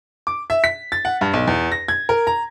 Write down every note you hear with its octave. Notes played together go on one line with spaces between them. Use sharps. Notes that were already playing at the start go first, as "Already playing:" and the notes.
D6
E5
B6
A6
F#5
G2
B1
E2
A#6
G#6
A#4
A#5